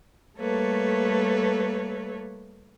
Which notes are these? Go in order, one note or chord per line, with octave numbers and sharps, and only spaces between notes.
G3 A3 A#3 A4 B4 C#5